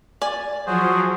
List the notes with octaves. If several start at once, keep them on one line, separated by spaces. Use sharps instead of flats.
D5 G#5
F3 F#3 F#4 G#4 C5